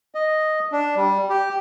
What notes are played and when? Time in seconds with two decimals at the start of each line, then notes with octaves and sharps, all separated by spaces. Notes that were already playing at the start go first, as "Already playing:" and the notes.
0.15 D#5
0.72 D4
0.96 G3
1.30 G4